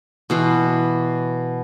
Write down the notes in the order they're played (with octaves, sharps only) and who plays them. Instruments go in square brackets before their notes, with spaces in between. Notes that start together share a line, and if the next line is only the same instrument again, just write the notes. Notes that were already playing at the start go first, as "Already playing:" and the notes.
[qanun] B2 E3 C6